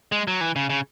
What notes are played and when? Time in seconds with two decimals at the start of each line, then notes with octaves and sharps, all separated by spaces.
0.12 G#3
0.28 F#3
0.41 E3
0.56 C#3
0.70 C#3